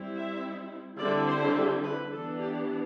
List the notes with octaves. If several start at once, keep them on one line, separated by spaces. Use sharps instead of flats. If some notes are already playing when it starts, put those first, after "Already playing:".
Already playing: G3 C4 E4
E5
D3 G3 C4 E4 D5
C5
G4
B4
E3 B3 D4 A4
G4